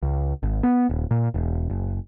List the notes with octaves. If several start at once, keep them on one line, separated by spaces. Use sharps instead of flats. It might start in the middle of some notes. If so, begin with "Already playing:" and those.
C#2
G#1
B3
D#1
A#2
E1
F#1